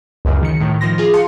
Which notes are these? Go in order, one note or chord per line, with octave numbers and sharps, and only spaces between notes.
C#2 F#2 C#3
D#3 C#7
A2 D#3
D#3 F3 C6 A#6
F4 G#4
F5 A5 C6 C#7